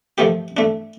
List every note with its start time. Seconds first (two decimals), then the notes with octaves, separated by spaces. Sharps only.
0.18 D#3 F3 A3 D#4 G4
0.57 A3 D4